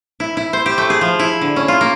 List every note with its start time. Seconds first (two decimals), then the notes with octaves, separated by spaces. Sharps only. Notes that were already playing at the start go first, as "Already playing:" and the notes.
0.20 E4
0.37 E4
0.53 C5
0.66 G4
0.78 A3
0.90 G#4
1.01 F3
1.19 E4
1.41 D3
1.56 C#4
1.68 F4
1.81 A#3